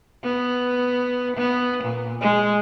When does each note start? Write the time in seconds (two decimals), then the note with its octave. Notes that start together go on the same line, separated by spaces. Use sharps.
0.24 B3
1.37 B3
1.84 A#2
2.21 G#3